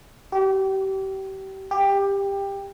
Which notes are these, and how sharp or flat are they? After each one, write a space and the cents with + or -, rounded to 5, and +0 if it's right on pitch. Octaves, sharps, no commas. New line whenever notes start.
G4 -30
G4 +15